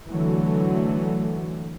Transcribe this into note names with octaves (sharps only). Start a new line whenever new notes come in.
D3 E3 F#3 A3